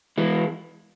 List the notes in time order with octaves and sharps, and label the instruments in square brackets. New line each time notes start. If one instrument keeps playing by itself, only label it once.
[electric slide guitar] E3 G#3